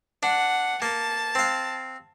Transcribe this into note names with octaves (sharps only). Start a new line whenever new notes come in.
D4 F#5
A#3 A5
C4 F5